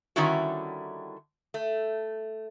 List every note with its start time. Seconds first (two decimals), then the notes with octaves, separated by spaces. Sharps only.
0.16 D3 D#3 G3 C#4 E4 F#4
1.54 A3